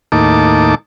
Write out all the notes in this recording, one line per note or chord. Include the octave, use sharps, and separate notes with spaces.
D#2 A2 A#3 D#4 A5 D6